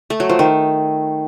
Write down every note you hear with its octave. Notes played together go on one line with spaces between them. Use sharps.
A3
F#3
F3
D#3